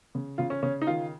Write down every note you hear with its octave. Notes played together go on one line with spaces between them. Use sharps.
C#3
C#3 F4
C#4
C#3 C#4
D#4
D#3 F4